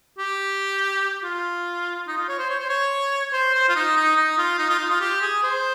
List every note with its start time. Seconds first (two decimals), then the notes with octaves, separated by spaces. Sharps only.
0.18 G4
1.23 F4
2.08 D#4
2.17 F4
2.28 C#5
2.39 C5
2.50 C#5
2.59 C5
2.69 C#5
3.33 C5
3.55 C5
3.69 F4
3.75 D#4
3.96 D#4
4.17 D#4
4.38 F4
4.58 D#4
4.70 F4
4.79 D#4
4.90 F4
5.00 G4
5.22 G#4
5.43 C5